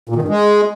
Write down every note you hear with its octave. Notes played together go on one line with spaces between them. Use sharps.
A#2
D#3
G2
G#3